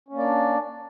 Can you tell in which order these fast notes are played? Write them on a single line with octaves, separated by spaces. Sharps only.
C#4 A#3 D5 D4